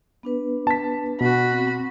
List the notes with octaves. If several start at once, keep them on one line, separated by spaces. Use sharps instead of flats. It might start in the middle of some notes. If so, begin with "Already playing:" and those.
B3 D4 B4
A5 B6
B2 F#4 B5
C4